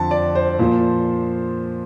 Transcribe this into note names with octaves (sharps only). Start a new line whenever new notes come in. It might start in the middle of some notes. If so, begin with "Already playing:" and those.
Already playing: F2 D3 F3 A5
D5
C5
A#2 F3